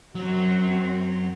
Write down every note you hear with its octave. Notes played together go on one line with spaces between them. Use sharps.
F#2 F#3 C4 F#4